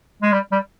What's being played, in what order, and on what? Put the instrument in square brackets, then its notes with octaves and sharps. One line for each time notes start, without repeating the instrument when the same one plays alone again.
[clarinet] G#3
G3
G3